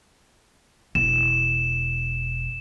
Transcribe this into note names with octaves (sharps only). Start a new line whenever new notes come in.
E1 E7